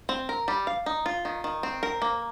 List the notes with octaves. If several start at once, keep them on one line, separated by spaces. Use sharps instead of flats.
C4
A#4
G3
F5
D#4
F4
D#3
D#3
C4
A#4
A#3